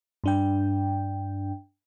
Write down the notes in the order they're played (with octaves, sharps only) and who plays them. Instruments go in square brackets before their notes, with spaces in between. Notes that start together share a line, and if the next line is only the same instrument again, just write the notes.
[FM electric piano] G2 D4 G5